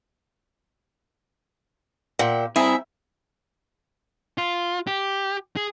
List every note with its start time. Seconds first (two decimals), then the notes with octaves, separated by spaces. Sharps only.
2.19 A#2 E5 F#5 G5
2.56 C4 E4 G#4 E5 A#5
4.38 F4
4.87 G4
5.57 G#4